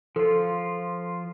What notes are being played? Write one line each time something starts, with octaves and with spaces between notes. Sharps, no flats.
F3 F4 A4